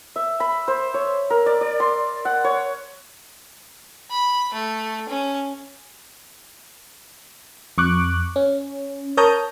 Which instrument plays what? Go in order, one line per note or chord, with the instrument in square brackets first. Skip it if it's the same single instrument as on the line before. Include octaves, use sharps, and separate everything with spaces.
[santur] E5
B5
C5
C#5
A#4
D5
D5
C6
F#5
C#5
[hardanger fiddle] B5
A3
C#4
[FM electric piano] F2 C#6 D6 F#6
C#4
A#4 C#5 A5 A#5 D#6 G6